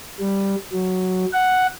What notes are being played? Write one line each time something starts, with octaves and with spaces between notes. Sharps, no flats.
G3
F#3
F#5